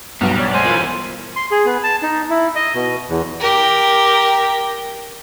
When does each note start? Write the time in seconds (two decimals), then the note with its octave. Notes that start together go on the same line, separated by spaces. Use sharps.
0.21 B1 G2 G3 B3 A#5
0.38 C#5 D5
0.53 G#3 C5 G#5
0.65 E3 C#4 F4 A#4 B5
1.36 C6
1.51 G#4
1.66 B3
1.83 A5
2.03 D#4
2.30 E4
2.56 D#5
2.75 B2
3.09 E2
3.40 G4 A#4